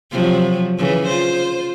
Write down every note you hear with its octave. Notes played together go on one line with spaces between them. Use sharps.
C3 F3 F#3
C#3 E3
F4 C5